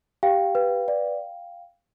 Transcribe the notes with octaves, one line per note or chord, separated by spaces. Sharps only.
G4 F5 G5
B4
D5